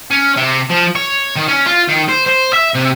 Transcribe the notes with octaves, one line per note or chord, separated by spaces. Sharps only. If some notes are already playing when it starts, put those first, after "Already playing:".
C#4
C3
F3
C#5
D#3
C#4
F4
D#3
C5
C5
E5
C3